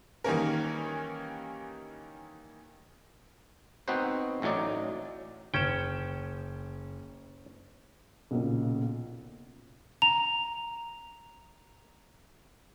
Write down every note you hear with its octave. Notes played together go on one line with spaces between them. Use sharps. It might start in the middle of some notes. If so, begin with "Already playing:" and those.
D#3 E3 G3 A#3 C#4 A#4
B3 C4 D#4 F#4 B4 C5
A1 A2 F#3 D#4 D5
F#1 C#4 G5 E7
B1 A#2 C#3
A#5 F7